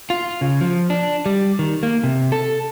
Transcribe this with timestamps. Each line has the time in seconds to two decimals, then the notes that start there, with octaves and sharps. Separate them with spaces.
0.10 F4
0.41 C#3
0.61 F3
0.90 D4
1.26 G3
1.59 D#3
1.83 A#3
2.04 C3
2.32 A4